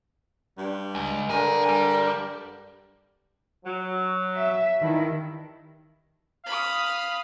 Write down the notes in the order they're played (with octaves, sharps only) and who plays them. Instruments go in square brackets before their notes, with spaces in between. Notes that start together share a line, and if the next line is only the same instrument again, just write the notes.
[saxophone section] G2 G3
[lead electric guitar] C#2
[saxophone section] G2 D3 A#4 [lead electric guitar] G#4
[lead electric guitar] G3
[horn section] F#3
[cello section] E5
[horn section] G2 E4 [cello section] D#3
[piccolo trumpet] F5 [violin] B5 D#6